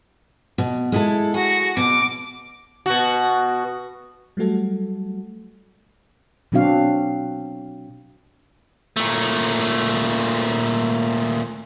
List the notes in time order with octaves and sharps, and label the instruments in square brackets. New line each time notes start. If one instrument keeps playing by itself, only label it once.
[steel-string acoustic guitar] B2
G#3 E4 A4
[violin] F#4 A#6 [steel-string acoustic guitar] G#4
[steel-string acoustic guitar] B2 [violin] D6
[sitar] B2 F#4
[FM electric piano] F#3 G3 A3 F#4 A4
[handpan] B2 F#3 C4 D4 F#4 F5
[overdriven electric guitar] A#2 A3